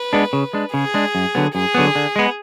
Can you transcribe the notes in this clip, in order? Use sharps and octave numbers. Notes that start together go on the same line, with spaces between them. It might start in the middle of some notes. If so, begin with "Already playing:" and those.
Already playing: B4
G#3 B3 D4
C#3
G#3 D4
C#3 G#4
G#3 D4
F#2
D3 F#3 B3
F#2 G#4
D3 F#3 B3
D3
G#3 B3